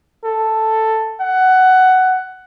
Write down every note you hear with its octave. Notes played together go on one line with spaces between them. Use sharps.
A4
F#5